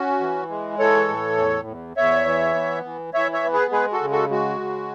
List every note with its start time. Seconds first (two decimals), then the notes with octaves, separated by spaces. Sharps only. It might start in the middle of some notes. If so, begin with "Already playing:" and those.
Already playing: C#4 F#4
0.20 E3
0.50 G#3
0.79 E3 A4 C#5
1.08 A2
1.38 E2
1.67 E2
1.97 E2 C#5 E5
2.25 E3
2.55 B3
2.85 E3
3.14 E3 C#5 E5
3.33 C#5 E5
3.43 B3
3.53 G#4 B4
3.72 G#3 G#4 B4
3.92 F#4 A4
4.01 C#3
4.11 F#4 A4
4.30 G#3 F#4
4.60 C#3